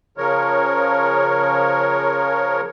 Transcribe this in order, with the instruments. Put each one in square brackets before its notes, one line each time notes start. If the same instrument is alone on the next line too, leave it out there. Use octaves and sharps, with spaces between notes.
[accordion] C#3 F3 A#4 C#5